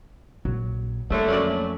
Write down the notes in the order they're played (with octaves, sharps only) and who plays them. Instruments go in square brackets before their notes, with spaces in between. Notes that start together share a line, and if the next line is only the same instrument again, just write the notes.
[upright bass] A#1 [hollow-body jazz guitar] F#3
[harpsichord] C2 A2 [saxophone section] D3 A3 [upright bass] A#3
[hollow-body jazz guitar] F2 C#4 F#4 [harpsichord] F#3 A#4 D5
[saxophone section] A3